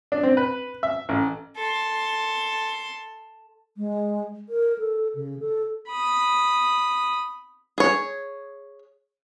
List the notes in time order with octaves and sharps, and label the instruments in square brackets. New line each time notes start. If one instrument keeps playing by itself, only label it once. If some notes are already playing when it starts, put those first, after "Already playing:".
[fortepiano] D4
C4
B4
E5
A1
[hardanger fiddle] A4 C6
[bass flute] G#3
A#4
A4
C#3
A4
[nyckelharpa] B5 D#6
[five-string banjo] G#4 C#5